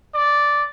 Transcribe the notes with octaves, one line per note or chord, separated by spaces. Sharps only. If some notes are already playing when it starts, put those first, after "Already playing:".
D5